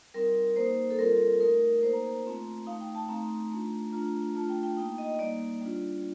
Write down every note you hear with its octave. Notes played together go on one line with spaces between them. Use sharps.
G3 C4 D#4 A#4
A#3 D#4 C5
A4
G3 C4 F4 A#4
A3 D#4 A#4
A#3 D#4 C5
A#5
A#5
A3 C4 F4
A3 D#4 F5
G5
A5
A3 C4 D#4 A#5
A3 D4 F4
A3 D4 F4 A#5
A3 D4 F4 A5
G5
G5
A#3 D#4 G5
D#5
G3 A#3 D#4 D5
G3 D4 F4